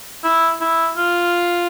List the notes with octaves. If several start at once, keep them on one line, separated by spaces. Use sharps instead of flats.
E4
E4
F4